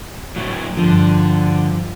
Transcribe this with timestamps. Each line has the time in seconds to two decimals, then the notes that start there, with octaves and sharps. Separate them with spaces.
0.36 A2 F#3
0.77 G2 D3 F3